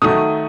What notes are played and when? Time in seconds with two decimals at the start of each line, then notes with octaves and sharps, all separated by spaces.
0.02 D#3 F#3 A3 D#6